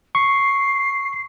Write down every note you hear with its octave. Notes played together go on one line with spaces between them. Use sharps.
C#6 C7